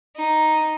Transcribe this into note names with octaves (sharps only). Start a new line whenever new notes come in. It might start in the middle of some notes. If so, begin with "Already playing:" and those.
D#4